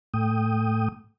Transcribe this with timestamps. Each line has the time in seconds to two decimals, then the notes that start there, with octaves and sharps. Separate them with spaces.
0.14 A2 A3 G5 D#6